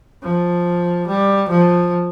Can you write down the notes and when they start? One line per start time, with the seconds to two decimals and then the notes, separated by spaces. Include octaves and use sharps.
0.23 F3
1.07 G3
1.48 F3